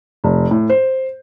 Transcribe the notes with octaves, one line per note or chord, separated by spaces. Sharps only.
F1
A2
C5